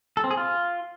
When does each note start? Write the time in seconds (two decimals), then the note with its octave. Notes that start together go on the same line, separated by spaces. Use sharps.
0.17 A4
0.24 C4
0.31 G#4
0.37 F4